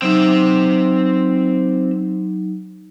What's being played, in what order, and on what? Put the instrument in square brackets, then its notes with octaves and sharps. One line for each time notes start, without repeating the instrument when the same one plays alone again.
[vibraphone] F#3 D#4 [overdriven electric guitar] C4 E5